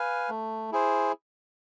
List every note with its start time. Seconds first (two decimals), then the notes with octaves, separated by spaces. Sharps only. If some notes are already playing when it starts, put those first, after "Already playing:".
Already playing: B4 F5 G#5
0.29 A3
0.72 E4 G#4 C5